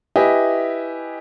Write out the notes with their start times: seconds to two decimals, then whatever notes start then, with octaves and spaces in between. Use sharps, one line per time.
0.16 E4 G4 B4 D#5 E5 G#5